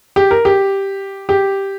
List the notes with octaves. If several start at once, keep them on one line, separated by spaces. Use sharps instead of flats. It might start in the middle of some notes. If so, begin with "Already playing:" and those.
G4
A#4
G4
G4